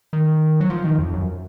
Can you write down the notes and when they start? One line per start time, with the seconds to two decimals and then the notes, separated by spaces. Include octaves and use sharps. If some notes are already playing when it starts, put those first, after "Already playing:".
0.13 D#3
0.61 F#3
0.70 F3
0.84 D#3
0.98 F2
1.14 F#2